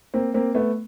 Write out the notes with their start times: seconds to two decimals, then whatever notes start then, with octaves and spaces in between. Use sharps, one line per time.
0.14 A#3 C4
0.34 A#3 C4
0.55 A3 B3